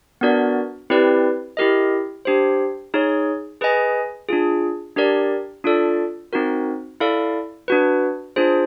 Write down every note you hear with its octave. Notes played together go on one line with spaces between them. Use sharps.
B3 D4 F#4 A#4 D5
C4 E4 G4 B4 D5
E4 G4 A#4 D#5
D4 G4 C5
D#4 G#4 C#5
G#4 B4 D#5 G#5
D4 F4 G#4
D4 G4 A#4 D5
D4 F4 A4 D5
C4 D#4 F#4 A#4
E4 A4 D5 F5
D4 F#4 B4
D4 F4 G#4 C5